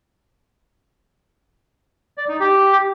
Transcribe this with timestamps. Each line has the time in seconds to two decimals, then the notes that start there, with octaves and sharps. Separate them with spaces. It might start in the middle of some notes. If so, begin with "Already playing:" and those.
2.18 D5
2.29 D#4
2.40 G4